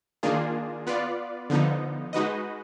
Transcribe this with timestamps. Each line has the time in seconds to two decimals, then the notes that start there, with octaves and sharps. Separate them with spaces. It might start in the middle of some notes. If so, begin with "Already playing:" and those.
0.23 D#3 A#3 D4 F4 G#4
0.87 B3 F4 B4 D5
1.50 D3 F3 B3 D#4
2.13 G#3 D#4 F#4 B4 D#5